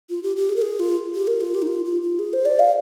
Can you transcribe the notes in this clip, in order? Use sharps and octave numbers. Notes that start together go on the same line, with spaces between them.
F4
G4
G4
G#4
A#4
G#4
F4
G4
A#4
F4
G4
D#4
F4
F4
F4
G#4
C5
D5
F5